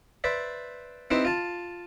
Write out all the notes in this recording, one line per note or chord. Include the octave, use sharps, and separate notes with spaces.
B4 C5 D5 E5
C4 D#4 E4 G4 B4 C5
F4 A5